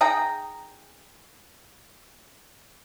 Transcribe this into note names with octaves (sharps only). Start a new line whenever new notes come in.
D#4 G#4 G5 A#5